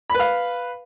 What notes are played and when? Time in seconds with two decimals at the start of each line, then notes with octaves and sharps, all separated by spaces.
0.10 B5
0.15 B4
0.19 F5